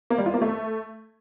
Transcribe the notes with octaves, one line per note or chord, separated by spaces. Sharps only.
A#3
G3
F4
A#3
A3